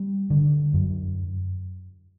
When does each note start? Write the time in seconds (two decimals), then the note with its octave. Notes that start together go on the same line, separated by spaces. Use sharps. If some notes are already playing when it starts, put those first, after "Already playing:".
Already playing: G3
0.30 D3
0.74 F#2